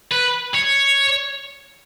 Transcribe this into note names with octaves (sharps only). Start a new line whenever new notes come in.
B4
C#5